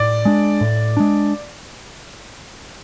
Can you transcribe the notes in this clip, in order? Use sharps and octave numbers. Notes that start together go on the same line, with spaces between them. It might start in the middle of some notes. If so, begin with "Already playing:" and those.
Already playing: A2 D5
G#3 D4
A2
G#3 D4